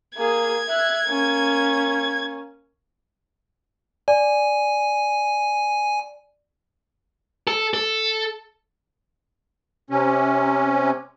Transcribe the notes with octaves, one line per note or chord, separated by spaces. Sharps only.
A#3 G#4 G#6
E5 F#6
A#3 C#4
D5 G#5
A4
A4
C3 C#4